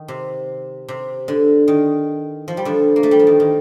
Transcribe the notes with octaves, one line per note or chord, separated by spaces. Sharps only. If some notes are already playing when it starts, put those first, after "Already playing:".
Already playing: D#3
C3
C3
D3
D#3
F3
G3
D3 F3
A#3
A3
G3
F3
D#3
D#3